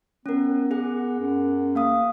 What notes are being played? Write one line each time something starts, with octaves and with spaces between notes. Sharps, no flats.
B3 C#4 A#4
G#4 F#5
F#2
A#3 F5 D#6